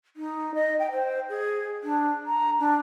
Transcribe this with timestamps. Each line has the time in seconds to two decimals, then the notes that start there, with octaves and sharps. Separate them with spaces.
0.16 D#4
0.54 D#5
0.79 G5
0.91 C5
1.29 G#4
1.83 D4
2.25 A#5
2.59 D4